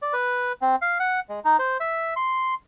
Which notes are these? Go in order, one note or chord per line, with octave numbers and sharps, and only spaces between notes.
D5
B4
C4
F5
F#5
G#3
D#4
C5
E5
C6